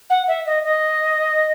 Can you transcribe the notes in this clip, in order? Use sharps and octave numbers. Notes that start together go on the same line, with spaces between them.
F#5
E5
D#5
D#5